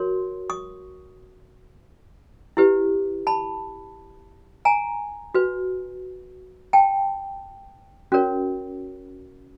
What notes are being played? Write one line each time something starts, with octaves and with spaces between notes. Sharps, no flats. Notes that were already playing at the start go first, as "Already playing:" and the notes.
Already playing: F#4 A#4 C#5 C6
C#6 D#6
E4 G4 B4
A5 B5
G#5 A#5
F#4 B4
G5 A5
C#4 F#4 A#4 C#5